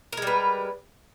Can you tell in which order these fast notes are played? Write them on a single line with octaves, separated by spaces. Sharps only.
A#4 G#3 G3 B4